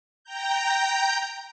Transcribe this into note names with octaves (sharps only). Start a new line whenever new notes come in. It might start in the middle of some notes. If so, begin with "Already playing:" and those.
G5 A#5 G6